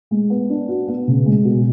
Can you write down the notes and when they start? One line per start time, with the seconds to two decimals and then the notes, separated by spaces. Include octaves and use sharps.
0.11 G#3
0.30 B3
0.50 D4
0.68 F#4
0.88 B3
1.07 C#3
1.26 G#3
1.45 B2